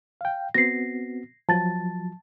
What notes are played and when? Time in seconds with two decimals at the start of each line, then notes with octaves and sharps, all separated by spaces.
0.21 F5 G5
0.54 B3 C4 F#4 A#6 C7
1.49 F3 F#3 A5 A6